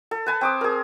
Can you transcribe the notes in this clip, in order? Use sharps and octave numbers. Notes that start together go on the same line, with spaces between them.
A4
B4 G#5 A5
C4 D6 D#6
G#4 A#4